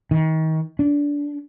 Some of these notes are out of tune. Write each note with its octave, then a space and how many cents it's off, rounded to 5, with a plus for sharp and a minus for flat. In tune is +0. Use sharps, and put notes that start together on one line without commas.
D#3 +35
D4 -20